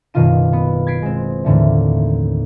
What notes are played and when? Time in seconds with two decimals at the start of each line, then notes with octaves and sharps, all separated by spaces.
0.14 F#1 B2 D#3 G3 F4 D#7
0.53 B3
0.87 G#6 A6 B6 C7 D7
1.02 G#3 C4
1.44 D#2 A2 D3 E3